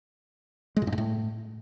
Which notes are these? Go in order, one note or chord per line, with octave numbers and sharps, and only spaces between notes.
G#3
A#2
G2
G#2
A2